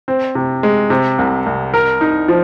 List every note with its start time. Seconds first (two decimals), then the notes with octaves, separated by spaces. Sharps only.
0.08 C4
0.35 C3
0.63 G#3
0.90 C3
1.18 C2
1.46 C2
1.74 A#4
2.01 D#4
2.28 F3